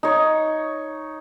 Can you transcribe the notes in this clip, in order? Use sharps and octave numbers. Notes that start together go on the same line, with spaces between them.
D#4 C#5